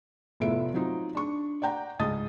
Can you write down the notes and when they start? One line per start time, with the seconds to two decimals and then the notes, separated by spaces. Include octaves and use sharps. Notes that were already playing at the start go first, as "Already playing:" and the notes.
0.40 F1 A2 B3 F4 E5 D7
0.74 F#3 C4 D#4 F4
1.15 D4 C#6
1.62 D5 F#5 G5 A#5
1.99 C#2 G#2 D#5 A5 D#6 A6